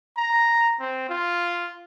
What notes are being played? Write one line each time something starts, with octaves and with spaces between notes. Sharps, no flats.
A#5
C4
F4